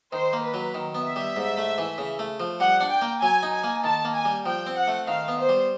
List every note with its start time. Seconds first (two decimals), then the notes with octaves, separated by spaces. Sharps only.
0.13 D#3 C5
0.33 A#3
0.44 B4
0.54 F#3
0.74 D#3
0.95 B3
1.05 E5
1.16 G3
1.36 G#2
1.57 A3
1.78 E3
1.98 C#3
2.19 A3
2.40 F3
2.60 G3 F#5
2.81 D4
2.91 G5
3.02 A#3
3.21 F#3 G#5
3.43 D#4
3.53 G#5
3.64 A#3
3.84 D#3 A5
4.05 A#3
4.15 G#5
4.25 G3
4.46 F3 G5
4.67 C4
4.76 F#5
4.87 A3
5.08 D#3 F5
5.28 B3
5.39 C5
5.49 G3